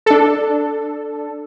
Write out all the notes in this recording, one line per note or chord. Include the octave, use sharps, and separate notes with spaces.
D4 A4